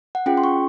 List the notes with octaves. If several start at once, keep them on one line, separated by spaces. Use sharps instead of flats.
F#5
C#4 F4 G#4 G5
C6
C#6